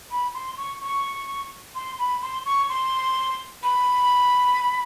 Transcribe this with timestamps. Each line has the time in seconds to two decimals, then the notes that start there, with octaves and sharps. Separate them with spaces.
0.11 B5
0.34 C6
0.57 C#6
0.81 C#6
1.75 C6
1.99 B5
2.22 C6
2.46 C#6
2.69 C6
3.63 B5